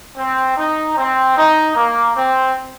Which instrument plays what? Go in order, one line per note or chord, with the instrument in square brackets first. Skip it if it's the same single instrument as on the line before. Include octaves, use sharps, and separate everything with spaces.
[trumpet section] C4
D#4
C4
D#4
A#3
C4